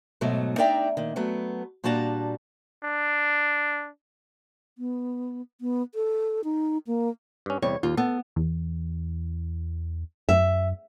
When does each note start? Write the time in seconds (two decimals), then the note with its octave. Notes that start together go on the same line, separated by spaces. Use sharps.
0.21 G#2 B2 F#3 A3
0.58 D4 D#4 D5 E5 G5 A#5
0.97 A#2 D#3
1.16 F#3 A3 B3
1.84 A#2 G3 D4 F#4 A5 A#5
2.83 D4
4.78 B3
5.61 B3
5.95 A4
6.44 D#4
6.87 A#3
7.46 G2 C#4
7.62 E2 C3 G3 C#5
7.83 D#2 F4
7.97 B3 A4
8.36 E2
10.29 F#2 E5